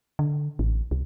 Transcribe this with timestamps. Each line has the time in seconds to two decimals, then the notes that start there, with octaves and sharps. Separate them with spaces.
0.19 D3
0.59 A1
0.91 C2